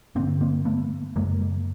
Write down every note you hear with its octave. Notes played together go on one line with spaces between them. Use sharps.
G2 D3 A#3 C4
A#3 C4
A3 B3
F#2 C#3 G#3 A#3